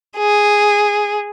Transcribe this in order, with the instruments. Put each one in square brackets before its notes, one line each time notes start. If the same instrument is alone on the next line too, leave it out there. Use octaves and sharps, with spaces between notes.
[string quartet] G#4